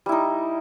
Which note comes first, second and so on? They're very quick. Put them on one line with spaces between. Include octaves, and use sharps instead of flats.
G3 E4 D#4